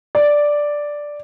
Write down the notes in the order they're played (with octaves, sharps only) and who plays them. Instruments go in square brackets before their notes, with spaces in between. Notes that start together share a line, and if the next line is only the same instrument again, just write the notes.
[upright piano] D5